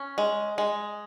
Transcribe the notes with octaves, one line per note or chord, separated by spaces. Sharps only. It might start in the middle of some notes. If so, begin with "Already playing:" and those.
Already playing: C#4
G#3
G#3